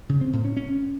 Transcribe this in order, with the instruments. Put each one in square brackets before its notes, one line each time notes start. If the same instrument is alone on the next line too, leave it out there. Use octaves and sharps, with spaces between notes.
[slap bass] C#3
C4
A2
C#4
C#4